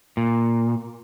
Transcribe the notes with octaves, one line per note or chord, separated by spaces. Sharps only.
A#2